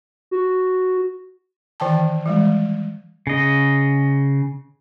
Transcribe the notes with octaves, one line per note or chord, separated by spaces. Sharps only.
F#4
D#3 E3 G5 A5
E3 G3 G#3
C#3 D#5